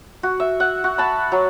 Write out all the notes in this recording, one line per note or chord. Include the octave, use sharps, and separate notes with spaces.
F#4
E5
F#5
F#4
A5 B5
F#3